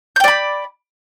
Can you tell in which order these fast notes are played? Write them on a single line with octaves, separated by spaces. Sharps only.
G6 G5 D5 B5